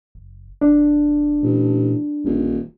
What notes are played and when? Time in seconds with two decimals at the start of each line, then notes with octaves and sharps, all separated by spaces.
0.15 F#1
0.61 E1 D4
1.43 A1 A#2
2.24 D#1 A1